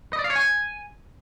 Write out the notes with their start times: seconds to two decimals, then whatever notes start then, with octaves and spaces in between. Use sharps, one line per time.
0.13 D#5
0.19 D5
0.24 F5
0.30 C#5
0.36 G#5